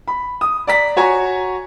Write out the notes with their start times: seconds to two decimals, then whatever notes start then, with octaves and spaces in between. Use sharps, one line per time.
0.08 B5
0.41 D#6
0.67 D5 A#5 B6
0.96 F#4 C#5 G#5 A#5